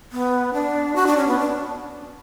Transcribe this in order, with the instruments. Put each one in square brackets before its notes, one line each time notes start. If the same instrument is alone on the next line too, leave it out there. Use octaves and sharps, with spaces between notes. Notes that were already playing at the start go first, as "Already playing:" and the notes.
[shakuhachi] B3
D4
F#4
D4
C#4
B3
D4